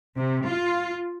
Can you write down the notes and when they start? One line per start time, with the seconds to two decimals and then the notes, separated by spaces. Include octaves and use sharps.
0.17 C3
0.47 F4